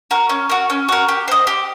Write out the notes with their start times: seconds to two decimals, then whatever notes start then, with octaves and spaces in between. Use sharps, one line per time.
0.11 F#4 A#4
0.29 C#4
0.50 F#4 A#4
0.70 C#4
0.89 F#4 A#4
1.08 G4
1.28 C5 D#5
1.47 G4